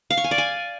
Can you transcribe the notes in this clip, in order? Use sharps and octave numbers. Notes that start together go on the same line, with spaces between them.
F5
C#6
G#5
D5
G#5